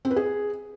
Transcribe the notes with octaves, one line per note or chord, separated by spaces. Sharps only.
C4
B4
G#4